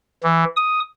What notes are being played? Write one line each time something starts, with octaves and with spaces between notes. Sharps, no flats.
E3
D#6